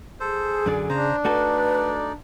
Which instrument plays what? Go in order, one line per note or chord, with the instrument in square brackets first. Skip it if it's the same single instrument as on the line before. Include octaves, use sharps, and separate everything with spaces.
[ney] G#4 [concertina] A4 C5
[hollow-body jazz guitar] F#2 D3 D5
[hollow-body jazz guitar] C#3 [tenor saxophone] D4 [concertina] C5 A#5
[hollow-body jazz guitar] A3 F#4 A4 [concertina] D#4 D5 [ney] B4